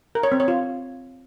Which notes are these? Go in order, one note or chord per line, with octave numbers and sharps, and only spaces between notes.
A#4
C#5
C4
C#5
F4